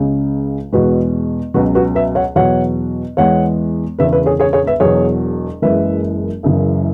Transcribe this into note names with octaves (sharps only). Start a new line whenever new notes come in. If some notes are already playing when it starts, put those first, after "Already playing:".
Already playing: C#2 C#3 G#3
E2 B2 G#3 F#4 B4
C#2 B2 F#3 F#4 B4
F#4 B4
B4 E5
C#5 F#5
E2 B2 F#3 C#5 F#5
E2 E3 G#3 C#5 F#5
E1 E2 C#3 B4 E5
B4 E5
G#4 C#5
G#4 C#5
G#4 C#5
B4 E5
E1 E2 B2 F#3 G#4 C#5
F#1 F#2 E3 G#3 B4 E5
F#1 F#2 C#3 E3